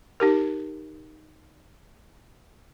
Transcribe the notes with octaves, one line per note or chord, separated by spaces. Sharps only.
D#4 G4 A#4